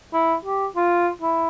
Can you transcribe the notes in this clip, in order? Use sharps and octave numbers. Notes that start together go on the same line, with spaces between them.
E4
G4
F4
E4